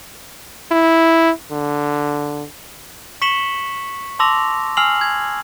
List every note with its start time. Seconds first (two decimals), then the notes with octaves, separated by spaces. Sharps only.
0.71 E4
1.51 D3
3.22 C#6 B6 C#7 E7 F#7 G7
4.19 A5 C6 D6 E6 A#6 F7
4.77 G#5 E6 F6 C7 F7 F#7
5.01 G#6